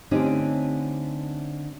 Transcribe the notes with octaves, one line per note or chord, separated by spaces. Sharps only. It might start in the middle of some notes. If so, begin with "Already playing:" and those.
D3 A3 C4 C#4 D#4 G4